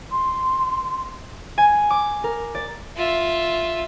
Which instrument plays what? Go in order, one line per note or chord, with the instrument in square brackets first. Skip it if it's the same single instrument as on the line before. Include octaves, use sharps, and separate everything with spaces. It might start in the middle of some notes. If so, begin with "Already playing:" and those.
[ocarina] C6
[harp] G#5
D6
A#4
D5
[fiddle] F4 E5